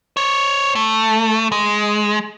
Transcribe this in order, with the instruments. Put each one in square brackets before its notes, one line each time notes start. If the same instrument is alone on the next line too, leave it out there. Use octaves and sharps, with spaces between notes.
[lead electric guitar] C5 C#5
A3
G#3